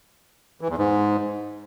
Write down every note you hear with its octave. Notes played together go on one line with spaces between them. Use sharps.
E3
E2
G#2